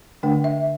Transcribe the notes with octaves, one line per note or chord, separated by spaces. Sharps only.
D3 A3 D4 G5
E5